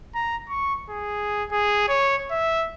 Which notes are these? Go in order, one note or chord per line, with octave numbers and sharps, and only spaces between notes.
A#5
C#6
G#4
G#4
C#5
E5